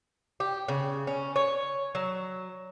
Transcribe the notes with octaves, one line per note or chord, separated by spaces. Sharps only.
G4
C#3
C#4
C#5
F#3